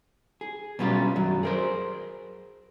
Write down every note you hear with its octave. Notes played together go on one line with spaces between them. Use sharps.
G#4
B2 F#3 G3 C#4 F4
F#2 D#3 F#3
G#4 A#4 C5